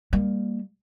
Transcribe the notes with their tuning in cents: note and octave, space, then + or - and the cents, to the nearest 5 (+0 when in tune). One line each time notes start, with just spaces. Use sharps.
G3 +25 A#3 +0